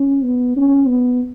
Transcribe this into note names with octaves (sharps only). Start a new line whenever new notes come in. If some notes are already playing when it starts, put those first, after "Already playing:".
Already playing: C#4
B3
C#4
B3